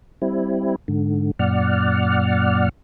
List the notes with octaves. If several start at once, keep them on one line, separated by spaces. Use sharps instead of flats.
G3 C4 E4
G#2 D3
F#2 A#2 D5 F#5 F6